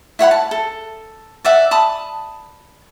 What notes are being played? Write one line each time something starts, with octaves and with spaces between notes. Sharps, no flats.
E4 C#5 F#5 B5
A5
A4
D5 E5 F#5
A5 B5 D#6